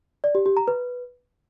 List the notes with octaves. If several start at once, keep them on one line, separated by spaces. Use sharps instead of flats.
D5
G4
G4
A#5
B4